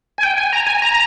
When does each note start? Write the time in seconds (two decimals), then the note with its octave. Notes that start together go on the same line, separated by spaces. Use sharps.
0.18 G#5
0.23 G5
0.38 G#5
0.53 A#5
0.67 G#5
0.82 A#5